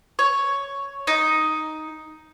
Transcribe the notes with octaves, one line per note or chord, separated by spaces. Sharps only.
C#5
D#4